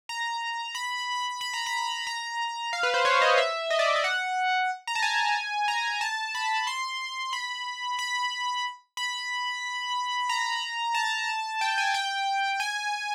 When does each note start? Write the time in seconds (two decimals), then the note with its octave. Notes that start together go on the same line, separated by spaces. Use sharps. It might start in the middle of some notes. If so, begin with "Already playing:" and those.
0.09 A#5
0.75 B5
1.41 B5
1.54 A#5
1.66 B5
2.07 A#5
2.73 F5
2.83 B4
2.94 C5
3.05 C#5
3.22 D#5
3.38 E5
3.70 D#5
3.79 D5
3.96 D5
4.04 F#5
4.87 A#5
4.95 A5
5.02 G#5
5.68 A#5
6.01 A5
6.35 B5
6.67 C6
7.33 B5
7.99 B5
8.97 B5
10.29 A#5
10.94 A5
11.61 G5
11.78 G#5
11.94 G5
12.60 G#5